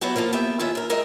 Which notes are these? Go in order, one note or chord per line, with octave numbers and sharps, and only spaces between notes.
F#3 B3 E4 F#4 G4
F3 A#3 F4 G#4 A4
B3 G4 E5 G5
E2 D#3 F3 C#4 E5
D#2 A#4
G#3 A#4 D#5 E5 G5 A#5